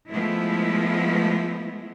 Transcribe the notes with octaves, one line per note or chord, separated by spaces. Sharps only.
F3 G#3 A3 B3 E4